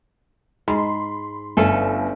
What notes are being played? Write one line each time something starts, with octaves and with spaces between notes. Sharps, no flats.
G#2 B5 C6
G1 A3 C#4 A4